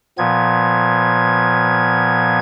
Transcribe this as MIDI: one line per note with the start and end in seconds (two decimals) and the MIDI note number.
0.18 2.40 46
0.18 2.40 53
0.18 2.40 59
0.18 2.40 92